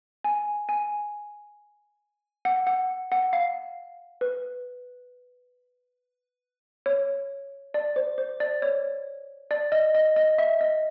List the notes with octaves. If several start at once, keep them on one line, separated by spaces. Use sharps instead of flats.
G#5
G#5
F#5
F#5
F#5
F5
B4
C#5
D5
C5
C5
D5
C#5
D5
D#5
D#5
D#5
E5
D#5